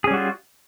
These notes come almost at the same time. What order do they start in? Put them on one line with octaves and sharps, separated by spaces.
G#4 C#4 G3 F#4 F4